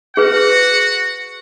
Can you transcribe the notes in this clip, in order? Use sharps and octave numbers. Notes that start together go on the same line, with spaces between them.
F#4 G#4 B4 F#5